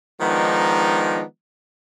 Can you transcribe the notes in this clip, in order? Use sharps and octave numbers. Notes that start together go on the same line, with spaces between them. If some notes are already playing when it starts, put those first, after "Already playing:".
D#3 F3 G#3 B3 D4 D#4